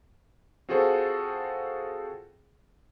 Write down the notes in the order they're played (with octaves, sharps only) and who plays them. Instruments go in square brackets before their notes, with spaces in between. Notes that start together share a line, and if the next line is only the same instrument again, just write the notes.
[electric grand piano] C4 F4 F#4 G#4 A4 C5